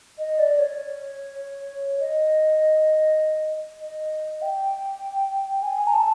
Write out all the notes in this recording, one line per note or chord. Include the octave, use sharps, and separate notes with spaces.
D#5
D5
C#5
D#5
D#5
G5
G#5
A#5
A5